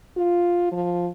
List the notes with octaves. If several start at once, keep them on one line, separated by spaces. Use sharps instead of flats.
F4
F3